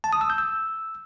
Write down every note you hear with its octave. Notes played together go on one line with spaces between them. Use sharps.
A5
D#6
E6
G6
E6